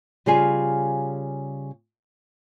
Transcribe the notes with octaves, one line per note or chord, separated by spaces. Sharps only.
C#3 G3 F4 G#4 F5 G#5